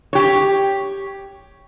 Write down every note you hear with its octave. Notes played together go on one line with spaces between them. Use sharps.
G4 C#5